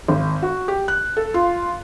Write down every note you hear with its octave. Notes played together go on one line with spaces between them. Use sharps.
G#1
F#4
G4
F#6
A4
F4